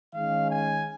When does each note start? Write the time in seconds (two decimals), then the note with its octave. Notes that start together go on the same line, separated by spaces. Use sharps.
0.13 D#3 G#3 C#4 F5
0.50 G#5